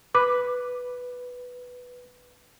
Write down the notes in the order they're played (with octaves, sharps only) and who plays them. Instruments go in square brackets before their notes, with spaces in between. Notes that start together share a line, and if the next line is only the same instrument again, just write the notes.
[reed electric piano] B4 [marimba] D6